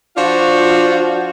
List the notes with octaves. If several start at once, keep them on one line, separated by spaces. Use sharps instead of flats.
F3 D4 F4 F#4